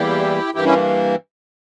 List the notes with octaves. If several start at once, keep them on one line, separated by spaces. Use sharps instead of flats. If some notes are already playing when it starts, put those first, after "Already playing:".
Already playing: E2 E3 G3 A#3 E4 G4
G2 E3 A#3 E4 G4
C#4 E4